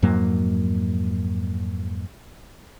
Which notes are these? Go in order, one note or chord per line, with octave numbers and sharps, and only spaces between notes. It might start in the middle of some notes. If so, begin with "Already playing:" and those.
F2 G#2 F#3 A#3